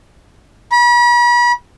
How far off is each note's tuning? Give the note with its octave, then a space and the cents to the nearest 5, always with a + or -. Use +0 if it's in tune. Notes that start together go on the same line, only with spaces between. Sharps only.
B5 -40